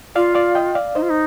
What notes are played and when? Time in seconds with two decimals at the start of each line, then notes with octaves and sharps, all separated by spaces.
0.16 F4 D5 F5
0.35 D5 F5
0.55 D#5 G5
0.75 D5 F5
0.95 D#4 C5 D#5
1.02 F4
1.10 D#4